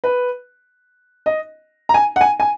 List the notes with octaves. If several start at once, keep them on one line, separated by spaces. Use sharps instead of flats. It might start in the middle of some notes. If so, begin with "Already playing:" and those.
B4
D#5
A#5
G#5
F#5
G#5
G#5